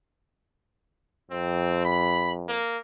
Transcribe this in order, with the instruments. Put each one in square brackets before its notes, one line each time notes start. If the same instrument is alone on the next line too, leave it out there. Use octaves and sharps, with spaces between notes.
[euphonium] F2 [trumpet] C4
[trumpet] B5
A#3